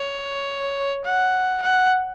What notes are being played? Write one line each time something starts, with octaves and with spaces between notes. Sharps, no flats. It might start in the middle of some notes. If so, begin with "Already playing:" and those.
Already playing: C#5
F#5
F#5